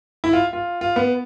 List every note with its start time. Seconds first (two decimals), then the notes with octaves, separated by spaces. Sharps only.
0.24 E4
0.33 F4
0.53 F4
0.81 F4
0.96 B3